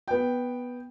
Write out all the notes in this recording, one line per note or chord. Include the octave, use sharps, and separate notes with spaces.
B3 G5